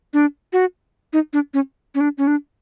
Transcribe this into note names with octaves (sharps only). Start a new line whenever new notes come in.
D4
F#4
D#4
D4
C#4
C#4
D4
C#4
D4